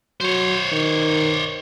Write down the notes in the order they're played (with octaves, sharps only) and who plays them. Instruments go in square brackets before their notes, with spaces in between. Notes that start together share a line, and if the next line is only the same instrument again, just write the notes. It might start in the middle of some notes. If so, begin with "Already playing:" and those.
[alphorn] F#3 [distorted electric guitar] C5 C#5
[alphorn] D#3